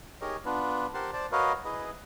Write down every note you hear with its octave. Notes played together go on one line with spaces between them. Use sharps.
D#4 G4 G#4 A#4 C#5 D#5
B3 D4 F4 B4
G4 A#4 C5 F#5 A5 C6
C5 D5 A5
F#4 A#4 B4 C#5 D#5 F5
E4 G#4 B4 D#5